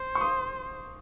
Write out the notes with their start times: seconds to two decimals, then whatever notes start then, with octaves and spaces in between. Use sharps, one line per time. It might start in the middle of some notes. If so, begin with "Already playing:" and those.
Already playing: C5
0.15 C#6
0.21 C6 D#6